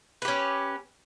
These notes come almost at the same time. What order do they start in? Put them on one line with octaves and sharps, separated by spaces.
B4 G4 C#4